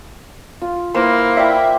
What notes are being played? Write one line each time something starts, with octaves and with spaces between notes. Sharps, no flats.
F4
A#3 E4 B4 C5
D5 E5 G5